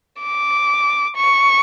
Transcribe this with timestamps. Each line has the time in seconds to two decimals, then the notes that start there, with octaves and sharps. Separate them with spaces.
0.22 D6
1.16 C#6